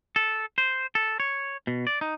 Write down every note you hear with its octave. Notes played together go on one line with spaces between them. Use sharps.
A4
C5
A4
C#5
B2
D5
D#4